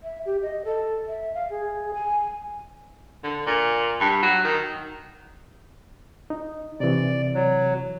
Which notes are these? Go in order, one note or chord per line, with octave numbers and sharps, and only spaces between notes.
E5
G4
D#5
A4
E5
F5
G#4
G#5
D3
A#2
G2
F#3
D#3
D#4
C3 E3 D5
F#3